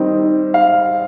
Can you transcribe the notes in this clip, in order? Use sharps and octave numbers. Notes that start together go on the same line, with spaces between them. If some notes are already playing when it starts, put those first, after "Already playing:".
Already playing: D#3 G3 C4 D#4
F5